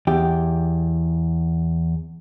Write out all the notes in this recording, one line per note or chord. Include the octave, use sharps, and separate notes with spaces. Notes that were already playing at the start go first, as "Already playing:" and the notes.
E2 G4